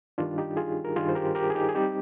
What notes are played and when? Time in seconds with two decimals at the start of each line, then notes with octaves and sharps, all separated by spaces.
0.18 G2 D#3 G3 D4 F4
0.38 D#4 G4
0.57 F4 G#4
0.84 A#4
0.96 G2 D#3 G3 F4 G#4
1.09 C5
1.15 G4 A#4
1.35 G4 A#4
1.50 G#4
1.55 D#4 G4
1.69 G#4
1.75 G3 C4 D#4 G4